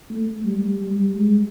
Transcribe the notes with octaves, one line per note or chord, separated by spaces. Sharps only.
A3
G3
G3
G#3